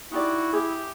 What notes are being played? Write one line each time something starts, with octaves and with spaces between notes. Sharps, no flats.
D#4 E4 F#4 G4 D5
G4 G#4 E5